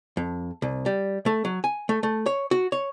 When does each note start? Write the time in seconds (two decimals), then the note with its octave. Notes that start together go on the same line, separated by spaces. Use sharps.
0.17 F2
0.62 C2
0.86 G3
1.26 A3
1.45 F#3
1.64 G#5
1.89 A3
2.03 A3
2.26 C#5
2.51 F#4
2.72 C#5